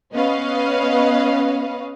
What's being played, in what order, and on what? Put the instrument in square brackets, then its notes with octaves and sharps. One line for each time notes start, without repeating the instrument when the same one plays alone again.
[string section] B3 C#4 B4 D#5 F5